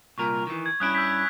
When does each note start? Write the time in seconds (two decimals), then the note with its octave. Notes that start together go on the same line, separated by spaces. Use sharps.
0.18 C2 A#2 A#4 C#6
0.47 D#3 E3
0.66 G#6
0.80 G2 C#4 E4 D#6 F#6 D7
0.95 E6 G6 B6